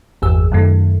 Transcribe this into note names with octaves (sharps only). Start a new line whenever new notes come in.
G1 E2 G#4 E6
F#2 D#3 A3